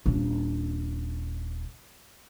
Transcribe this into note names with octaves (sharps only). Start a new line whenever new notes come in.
D#1 D4